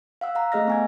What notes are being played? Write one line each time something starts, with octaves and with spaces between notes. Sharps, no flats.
F5 F#5 E6
F5 F#5 A#5
A3 G#4 D#5 F6 A#6
B3 G#5 G#6